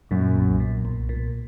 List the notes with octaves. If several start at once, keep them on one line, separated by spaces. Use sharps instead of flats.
F#2 A#2
B1
A#2
B1
A#2